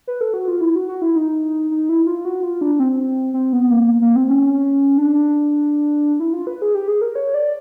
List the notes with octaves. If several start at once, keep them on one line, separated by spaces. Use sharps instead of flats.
B4
A4
F#4
F4
E4
F#4
F#4
E4
D#4
D#4
E4
F4
F#4
F4
D4
C4
C4
B3
A#3
A#3
C4
C#4
D4
E4
F4
B4
G#4
G4
G#4
A#4
C#5
D5